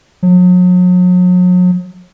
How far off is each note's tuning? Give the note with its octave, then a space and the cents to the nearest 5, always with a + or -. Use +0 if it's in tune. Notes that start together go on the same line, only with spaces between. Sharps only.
F#3 -40